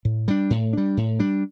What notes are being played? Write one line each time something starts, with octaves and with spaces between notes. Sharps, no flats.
A2
G3 D4
A2
G3 D4
A2
G3 D4